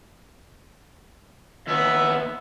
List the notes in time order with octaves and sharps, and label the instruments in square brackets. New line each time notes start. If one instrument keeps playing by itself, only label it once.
[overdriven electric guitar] D#2 B3 [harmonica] E5